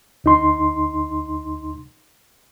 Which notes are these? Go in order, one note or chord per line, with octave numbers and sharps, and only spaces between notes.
D2 D#4 C6